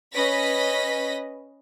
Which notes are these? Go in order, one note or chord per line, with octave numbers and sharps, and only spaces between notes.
C#4 B4 D#5 A#6 B6